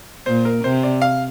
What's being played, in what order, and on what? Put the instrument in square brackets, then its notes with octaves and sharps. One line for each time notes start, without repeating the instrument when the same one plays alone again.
[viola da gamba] A#2 [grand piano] C5
[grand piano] A#4
[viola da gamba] C3 [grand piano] C5
[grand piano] D5
F5